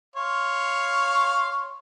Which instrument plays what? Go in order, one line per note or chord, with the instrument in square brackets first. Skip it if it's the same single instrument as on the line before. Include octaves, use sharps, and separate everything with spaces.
[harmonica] C#5 F5 C6